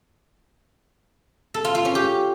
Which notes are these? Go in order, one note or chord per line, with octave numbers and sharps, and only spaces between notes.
A4
F4
F4
C#4
G4